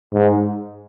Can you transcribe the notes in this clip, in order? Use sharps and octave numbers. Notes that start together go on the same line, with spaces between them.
G#2